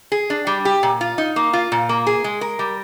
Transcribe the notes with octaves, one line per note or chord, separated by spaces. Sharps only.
G#4
D4
G3
G4
A#2
F4
D#4
A#3
F4
A#2
A#3
G#4
G#3
A#4
G3